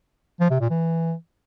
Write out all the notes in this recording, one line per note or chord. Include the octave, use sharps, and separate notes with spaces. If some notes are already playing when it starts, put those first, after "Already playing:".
F3
C3
A#2
E3